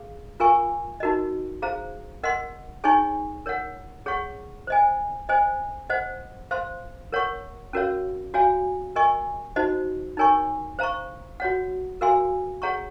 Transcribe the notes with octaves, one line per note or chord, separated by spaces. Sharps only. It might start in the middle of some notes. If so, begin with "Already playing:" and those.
Already playing: G#4 F5
F4 A#4 F5 G#5 C#6
D#4 F#4 A#4 D#5
G#4 C5 F5 A#5
A#4 D#5 F#5 C6
D#4 G#4 C#5 G#5 C#6
A#4 C#5 F#5
G#4 C#5 F#5 C#6
C5 D#5 G#5
C5 D#5 G#5
C5 D#5 F#5
C5 F5 C6
A#4 C#5 F#5 C#6
C#4 F#4 A#4 C#5 F5
F#4 C#5 F5 G#5
A#4 D#5 G#5 C#6
D#4 F#4 C5 D#5
D#4 A#4 C#5 G#5 C#6
C5 F5 A#5 C#6
F#4 C#5 F#5
F#4 A#4 F5 G#5 C6
G#4 C#5 F#5 A#5 C#6